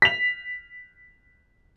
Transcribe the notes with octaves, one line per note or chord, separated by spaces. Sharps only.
B6 F7